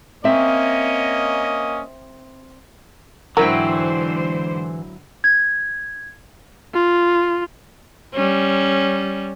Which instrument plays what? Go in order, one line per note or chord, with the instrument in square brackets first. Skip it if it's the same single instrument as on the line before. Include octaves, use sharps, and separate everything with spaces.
[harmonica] A#3 C#4 D#5 [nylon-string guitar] C4 E5
[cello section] G#2 D3 C5 [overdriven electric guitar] E3 [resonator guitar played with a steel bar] F#3 E4 G5 [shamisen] A#4
[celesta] G#6
[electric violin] F4
[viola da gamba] G3 C#4